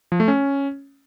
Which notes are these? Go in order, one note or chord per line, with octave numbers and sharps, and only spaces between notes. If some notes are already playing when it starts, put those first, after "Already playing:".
F3
A3
C#4